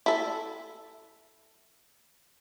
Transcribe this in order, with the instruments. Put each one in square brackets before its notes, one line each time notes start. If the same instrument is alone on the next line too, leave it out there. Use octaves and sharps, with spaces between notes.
[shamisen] E4 A4